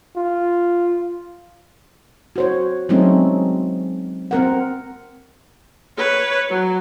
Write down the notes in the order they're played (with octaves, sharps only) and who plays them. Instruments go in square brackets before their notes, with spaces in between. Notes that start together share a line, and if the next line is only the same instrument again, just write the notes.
[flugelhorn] F4
[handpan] F#4 C5 C#5
F#3 G#3 A3 C4 C#4 D#4
C4 A#4 F#5
[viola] B4 C#5
F#3